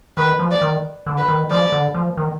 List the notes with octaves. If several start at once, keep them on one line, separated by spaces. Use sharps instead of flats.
D#3 B4
F3
D5
D#3
D3
B4
D#3
F3 D5
D3
F3
D#3